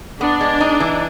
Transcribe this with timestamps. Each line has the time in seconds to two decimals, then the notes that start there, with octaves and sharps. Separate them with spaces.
0.21 B3 D4
0.41 G#3
0.60 D#4
0.80 E3